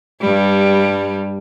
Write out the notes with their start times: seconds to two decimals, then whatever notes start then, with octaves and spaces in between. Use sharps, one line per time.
0.21 G2 G3